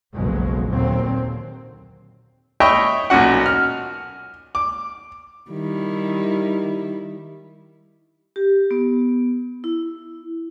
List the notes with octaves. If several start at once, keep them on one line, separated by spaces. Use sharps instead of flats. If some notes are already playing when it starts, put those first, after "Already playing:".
F#1 B1 F2 B2 F#3 G#3
D#2 A#2 D3 F#3 C4
C#5 D#5 E5 G5 B5 C#6
B1 A#2 C#4 F#4 F#5
F6
D6
D#3 G3 E4
G4
B3
E4